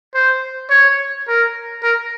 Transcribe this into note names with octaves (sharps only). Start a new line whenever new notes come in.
C5
C#5
A#4
A#4